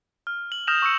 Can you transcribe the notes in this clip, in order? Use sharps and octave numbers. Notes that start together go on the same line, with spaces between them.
F6
F#7
D#6 F6 G6 A#6 E7 F7
C#6 E6 C#7